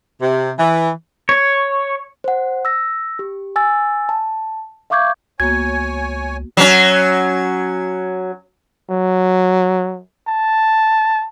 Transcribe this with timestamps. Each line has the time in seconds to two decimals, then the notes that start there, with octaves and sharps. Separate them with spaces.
0.21 C3
0.59 E3
1.29 C#5
2.24 C5 F#5
2.65 E6 A#6
3.19 G4
3.56 G#5 E6 A6
4.09 A5
4.90 E5 F5 C#6 D6 G6 G#6
5.40 C#2 A#3 B3 F#4 C#5 G#5 G#6
6.57 F#3 C#4
8.90 F#3
10.28 A5